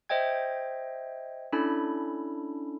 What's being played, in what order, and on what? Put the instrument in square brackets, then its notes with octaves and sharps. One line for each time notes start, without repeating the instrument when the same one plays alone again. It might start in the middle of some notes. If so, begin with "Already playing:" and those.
[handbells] C5 D#5 E5 G5 G#6
C#4 D4 E4 A4 B5